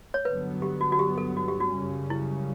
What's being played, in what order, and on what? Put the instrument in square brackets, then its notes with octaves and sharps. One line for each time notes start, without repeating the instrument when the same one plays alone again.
[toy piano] C#5
[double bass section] G2 D3 F#3 B3 [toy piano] B4
[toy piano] G4
F#4
F#4
G4
A4
F#4
G4
F#4
[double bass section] F#2 C#3 G3 C#4
[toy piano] E4